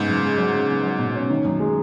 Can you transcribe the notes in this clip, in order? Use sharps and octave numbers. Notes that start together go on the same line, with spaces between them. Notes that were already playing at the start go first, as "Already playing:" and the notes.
Already playing: G#2 C#3 B3
F#2
G#3
F#3
C#3
B3
F#3
B2
C#4
D#3
F#2
G#3